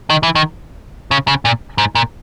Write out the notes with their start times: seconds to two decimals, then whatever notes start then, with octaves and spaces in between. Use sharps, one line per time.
0.10 D#3
0.23 E3
0.35 D#3
1.11 C#3
1.28 C#3
1.45 A#2
1.78 G#2
1.95 A#2